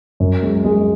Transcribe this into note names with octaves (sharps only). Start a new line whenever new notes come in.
F#2
G#3
G#3